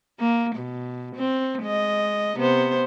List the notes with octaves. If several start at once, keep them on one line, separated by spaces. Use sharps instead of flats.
A#3
B2
C4
G#3 D#5
C3 B3 C5